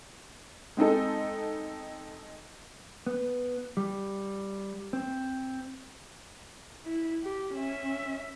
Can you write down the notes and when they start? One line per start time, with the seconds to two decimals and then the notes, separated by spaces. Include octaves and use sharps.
0.77 G#3 C4 D#4 A4
3.07 B3
3.77 G3
4.93 C4
6.86 E4
7.24 G4
7.54 C#4 E5